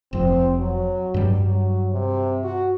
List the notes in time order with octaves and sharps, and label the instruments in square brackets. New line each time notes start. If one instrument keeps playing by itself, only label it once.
[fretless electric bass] F1 F2 [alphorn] C4
[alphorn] F#3
[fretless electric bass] G2 G3
[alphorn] F#3
C3
F#4